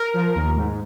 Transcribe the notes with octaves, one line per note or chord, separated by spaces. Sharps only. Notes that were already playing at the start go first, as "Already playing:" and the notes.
Already playing: A#4
F3
D#2
G#2